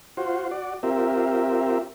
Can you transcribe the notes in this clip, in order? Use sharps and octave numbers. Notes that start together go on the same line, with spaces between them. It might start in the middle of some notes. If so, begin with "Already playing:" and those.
F4 F#4 C5
F#4 D5
C4 F4 G4 A#4 E5